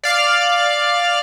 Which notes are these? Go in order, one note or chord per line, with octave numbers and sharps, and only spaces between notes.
D5 F5 F6